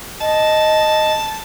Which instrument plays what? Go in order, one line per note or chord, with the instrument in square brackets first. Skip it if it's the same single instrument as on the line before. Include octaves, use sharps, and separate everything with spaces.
[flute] D#5 [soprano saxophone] A5